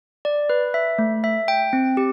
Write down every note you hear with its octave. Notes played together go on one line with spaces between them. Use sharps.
D5
B4
E5
A3
E5
G5
C4
G4